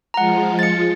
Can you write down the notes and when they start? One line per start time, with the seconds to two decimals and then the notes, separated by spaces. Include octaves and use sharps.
0.14 F3 G#3 F4 F#5 A#5
0.59 A6 C#7